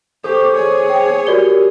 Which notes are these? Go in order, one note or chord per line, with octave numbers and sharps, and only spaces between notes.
G4 A4 C5 C#6 D6
G#4 C#5
G5
F#4 G4 A#4 D5 G7